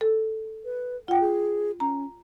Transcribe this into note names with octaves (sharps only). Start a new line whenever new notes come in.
A4
B4
F4 F#5 G5
G#4
C#4 A#5